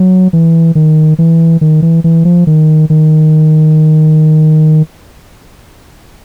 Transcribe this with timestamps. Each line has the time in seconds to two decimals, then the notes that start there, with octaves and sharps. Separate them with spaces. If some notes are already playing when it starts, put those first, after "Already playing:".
Already playing: F#3
0.33 E3
0.75 D#3
1.19 E3
1.61 D#3
1.82 E3
2.04 E3
2.25 F3
2.47 D#3
2.90 D#3